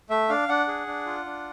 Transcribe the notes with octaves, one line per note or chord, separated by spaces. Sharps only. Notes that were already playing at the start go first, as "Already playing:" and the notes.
A3 E5
D4 F5
D4 F#5
G#4
D4
F4
D4